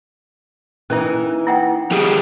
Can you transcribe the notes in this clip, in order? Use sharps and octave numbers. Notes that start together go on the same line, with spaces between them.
E3 A#3 C#4 D#4 E4
E4 F#5 G5
F3 G4 G#4